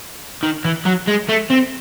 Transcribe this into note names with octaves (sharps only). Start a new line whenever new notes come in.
D#3
E3
F#3
G#3
A3
C4